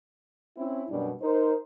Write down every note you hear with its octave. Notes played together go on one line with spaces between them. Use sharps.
C4 C#4 E4
F#2 B2 G3 D4
D#4 A#4 C5